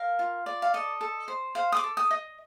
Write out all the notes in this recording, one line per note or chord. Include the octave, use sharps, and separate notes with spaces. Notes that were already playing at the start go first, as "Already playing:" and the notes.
Already playing: A#4 F5
F4
D5
F5
A4 D#5
A4
C5
C5 F5
D#6
D6
A4
D#6
D#5